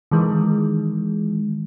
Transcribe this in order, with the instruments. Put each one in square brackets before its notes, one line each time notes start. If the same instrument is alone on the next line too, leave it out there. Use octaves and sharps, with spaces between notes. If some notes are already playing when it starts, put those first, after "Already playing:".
[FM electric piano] D#3 E3 G#3